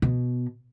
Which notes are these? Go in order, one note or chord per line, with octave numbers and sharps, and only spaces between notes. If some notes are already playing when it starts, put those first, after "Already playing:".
B2